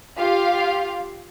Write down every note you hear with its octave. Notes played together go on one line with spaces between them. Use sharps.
F4 G4 F5